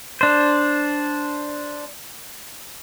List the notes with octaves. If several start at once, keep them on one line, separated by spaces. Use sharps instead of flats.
D4 C5